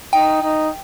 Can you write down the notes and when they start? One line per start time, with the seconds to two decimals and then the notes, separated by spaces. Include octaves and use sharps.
0.13 D#4 G5
0.43 D#4